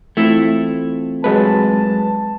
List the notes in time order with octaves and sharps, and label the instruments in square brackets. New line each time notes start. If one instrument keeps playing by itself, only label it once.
[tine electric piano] E3 C4 F4 [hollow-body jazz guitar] A3 E4
[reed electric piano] F#3 G#3 B4 [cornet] A5